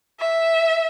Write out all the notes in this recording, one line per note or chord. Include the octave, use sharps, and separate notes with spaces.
E5